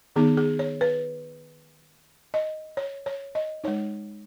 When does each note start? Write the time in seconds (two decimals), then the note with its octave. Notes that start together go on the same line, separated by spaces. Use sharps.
0.16 D#3 B3 D#4 G#4
0.37 G#4
0.59 C#5
0.81 B4
2.34 D#5
2.77 C#5
3.06 C#5
3.35 D#5
3.64 G#3 D#4 C#5